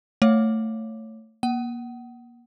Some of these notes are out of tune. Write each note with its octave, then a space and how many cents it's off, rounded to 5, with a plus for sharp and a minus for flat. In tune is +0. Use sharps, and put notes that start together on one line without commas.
A3 +15 C#5 +0 F5 -10
A#3 +30 F#5 +35